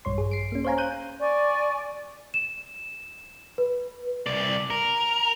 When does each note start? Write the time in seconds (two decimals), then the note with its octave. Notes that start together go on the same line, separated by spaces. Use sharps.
0.05 A#1 G2 C#5 C6
0.18 G#4
0.31 C7 D7
0.52 A#3 C#4
0.65 C5 C#5 F5 G#5 A#5
0.78 F#6 G6 D#7
1.20 D5 G#5 C#6
2.34 E7
3.58 B4
4.26 C2 D5
4.70 A#4